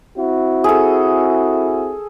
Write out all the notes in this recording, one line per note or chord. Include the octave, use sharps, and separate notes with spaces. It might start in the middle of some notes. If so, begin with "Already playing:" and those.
C4 E4 F#4
G#4 A4